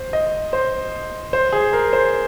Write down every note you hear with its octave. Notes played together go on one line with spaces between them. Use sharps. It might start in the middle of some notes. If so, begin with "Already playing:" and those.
Already playing: C5
D#5
C5
C5
G#4
A#4
C5